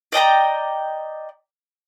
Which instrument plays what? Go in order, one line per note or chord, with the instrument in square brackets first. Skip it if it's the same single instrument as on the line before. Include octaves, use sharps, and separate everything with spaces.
[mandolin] D5 D#5 G5 A#5